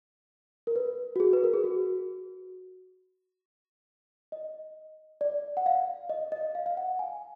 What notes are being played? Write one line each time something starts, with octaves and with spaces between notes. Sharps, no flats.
A#4
B4
F#4
G#4
B4
A#4
G#4
F#4
D#5
D5
F#5
F5
D#5
D#5
F5
F5
F#5
G#5